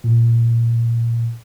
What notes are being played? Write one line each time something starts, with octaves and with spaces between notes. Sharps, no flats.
A#2